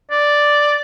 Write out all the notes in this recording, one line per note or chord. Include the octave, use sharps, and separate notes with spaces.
D5